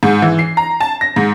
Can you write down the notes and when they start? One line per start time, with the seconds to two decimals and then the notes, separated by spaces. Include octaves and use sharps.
0.03 G#2
0.22 E3
0.39 C7
0.57 A#5
0.80 A5
1.01 A#6
1.16 G#2